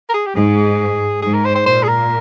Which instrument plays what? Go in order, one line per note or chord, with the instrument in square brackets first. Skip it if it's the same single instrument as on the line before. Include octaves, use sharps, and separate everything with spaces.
[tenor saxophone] A#4
G#4
G4
[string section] G#2 [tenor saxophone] G#4
[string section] G#2 [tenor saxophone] G#4
[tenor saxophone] A#4
C5
C5
[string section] A#2 [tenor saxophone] C5
[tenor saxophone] G#4
A#4